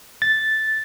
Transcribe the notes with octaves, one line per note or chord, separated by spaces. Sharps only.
A6